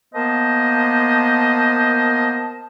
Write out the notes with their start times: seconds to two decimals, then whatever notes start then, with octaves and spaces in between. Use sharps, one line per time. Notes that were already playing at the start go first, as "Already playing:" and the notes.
0.14 A#3 B3 C5 D#5 A5